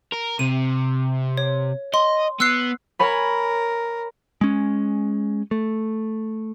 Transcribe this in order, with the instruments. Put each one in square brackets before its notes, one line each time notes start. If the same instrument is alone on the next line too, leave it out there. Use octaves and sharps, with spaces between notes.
[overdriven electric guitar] A#4
[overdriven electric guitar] C3 [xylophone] D#7
[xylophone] C#5
[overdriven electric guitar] D#5 [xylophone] C6
[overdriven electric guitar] B3 [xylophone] E6 F#6 C7
[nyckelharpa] A#4 [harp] C#5 G#5 B5
[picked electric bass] G#3 C#4
A3